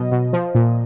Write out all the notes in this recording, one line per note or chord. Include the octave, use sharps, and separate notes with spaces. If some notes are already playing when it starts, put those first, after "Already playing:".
Already playing: B2 F#3 D#5
B2
F3
A#2